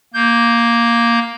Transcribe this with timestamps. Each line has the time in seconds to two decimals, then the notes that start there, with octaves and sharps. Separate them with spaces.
0.14 A#3 G6